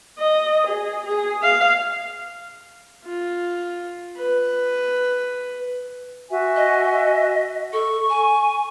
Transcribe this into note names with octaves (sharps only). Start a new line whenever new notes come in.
D#5
G#4
G#4
F5
F4
B4
F#4 E5 G#5
D#5
A4 C#6
G#5